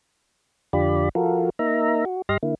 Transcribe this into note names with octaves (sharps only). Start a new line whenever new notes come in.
F2 D3 F4 G4 D5 B5
F3 F4 F#4 A4 A#4
A#3 D#4 E5 A#5
F#4
G2 G4 D#5 C6 F6 A#6
D3 A#3 E4